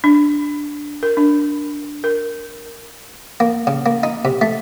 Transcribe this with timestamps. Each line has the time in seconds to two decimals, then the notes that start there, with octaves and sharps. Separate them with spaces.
0.04 D4
1.03 A#4
1.17 D4
2.04 A#4
3.40 A#3
3.67 C#3
3.86 A#3
4.03 D#4
4.25 C3
4.41 A3